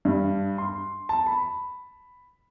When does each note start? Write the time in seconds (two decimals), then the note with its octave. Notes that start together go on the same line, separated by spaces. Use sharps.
0.05 G2
0.58 C6
1.09 A5
1.26 B5